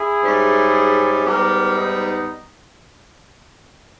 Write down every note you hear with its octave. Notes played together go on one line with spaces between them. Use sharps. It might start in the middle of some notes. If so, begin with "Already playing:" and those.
Already playing: E4 G#4
G#2 G3 C#4
G#2 G3 B3 G4 A#4
D#4